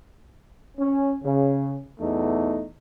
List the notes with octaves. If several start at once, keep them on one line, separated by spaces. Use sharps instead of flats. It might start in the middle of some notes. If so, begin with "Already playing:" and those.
C#4
C#3
B1 E2 A3 D#4